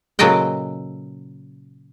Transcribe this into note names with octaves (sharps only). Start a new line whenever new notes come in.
A#2 C#3 F#3 A4 D#5 G5